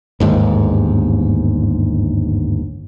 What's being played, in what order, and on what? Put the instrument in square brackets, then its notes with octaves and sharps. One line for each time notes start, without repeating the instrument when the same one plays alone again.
[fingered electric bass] G1 D#2 G#2